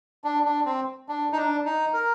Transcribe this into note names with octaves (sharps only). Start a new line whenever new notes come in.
D4
D4
C4
D4
D#4
D4
D#4
A#4